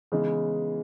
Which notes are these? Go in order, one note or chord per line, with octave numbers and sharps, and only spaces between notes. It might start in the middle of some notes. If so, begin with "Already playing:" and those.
C#3 E3 G#3 B3 D#4